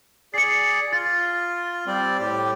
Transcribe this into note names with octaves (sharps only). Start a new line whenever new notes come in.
G#4 D5 C7 C#7
F4 A6
G3 C4 D5
A2 G4